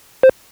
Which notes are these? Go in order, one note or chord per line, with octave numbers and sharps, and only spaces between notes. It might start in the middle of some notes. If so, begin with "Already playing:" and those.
C5